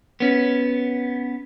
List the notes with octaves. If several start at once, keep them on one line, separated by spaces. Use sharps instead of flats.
B3 C#4